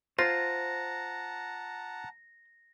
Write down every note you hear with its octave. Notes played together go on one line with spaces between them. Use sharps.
F4 C5 F#5 A5 A#5 A#6